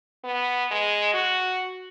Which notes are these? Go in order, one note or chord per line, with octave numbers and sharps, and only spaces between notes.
B3
G#3
F#4